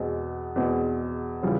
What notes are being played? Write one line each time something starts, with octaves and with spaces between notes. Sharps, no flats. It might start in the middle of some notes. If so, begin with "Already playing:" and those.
Already playing: E2 B2 G#3 C4
E2 B2 G#3 C4
C#3 E3 G3 C4 F4